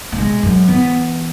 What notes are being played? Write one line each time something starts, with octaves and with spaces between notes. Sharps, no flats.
A2
B2 G#3
F#2
E3 B3